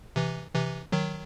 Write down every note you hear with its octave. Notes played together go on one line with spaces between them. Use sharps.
C3 E3
C3 E3
D#3 F#3